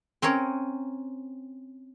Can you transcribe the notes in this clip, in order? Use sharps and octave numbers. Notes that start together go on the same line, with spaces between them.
C4 C#4 A#4 C#5